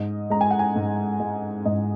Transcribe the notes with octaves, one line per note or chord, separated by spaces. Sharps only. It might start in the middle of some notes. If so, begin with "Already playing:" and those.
Already playing: G#2 D#5
G#3 A#5
G#5
F#5
G#5
G#2
G#3
G#2 D#5